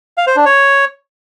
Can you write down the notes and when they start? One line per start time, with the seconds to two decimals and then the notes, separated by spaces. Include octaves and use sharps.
0.17 F5
0.27 C5
0.36 D4
0.46 C#5